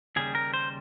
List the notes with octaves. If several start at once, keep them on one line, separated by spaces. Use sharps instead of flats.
D#2 C#3 G3 G#4
A#4
C5